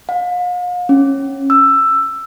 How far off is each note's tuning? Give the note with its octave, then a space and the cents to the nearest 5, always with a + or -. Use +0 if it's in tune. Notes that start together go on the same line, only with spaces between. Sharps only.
F5 +40
C#4 -20
E6 +10